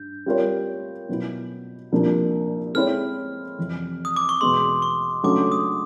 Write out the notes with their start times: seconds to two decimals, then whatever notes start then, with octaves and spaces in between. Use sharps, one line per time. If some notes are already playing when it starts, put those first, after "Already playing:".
Already playing: G2 G6
0.26 G3 C4 F4 A#4 C#5
1.09 B2 F#3 B3 E4
1.92 C2 A#2 F3 A#3 D4
2.75 G#3 C4 E4 A4 C#5 F6
3.58 F2 C3 E3
4.05 D#6
4.16 D6
4.29 C#6
4.41 E2 B2 G#3 C6
4.82 C#6
5.23 C#2 C#3 F#3 A3 D4 D6
5.52 D#6